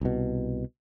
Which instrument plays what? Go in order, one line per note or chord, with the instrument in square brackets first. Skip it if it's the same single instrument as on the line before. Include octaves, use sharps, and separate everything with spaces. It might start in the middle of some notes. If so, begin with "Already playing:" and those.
[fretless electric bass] C2 B2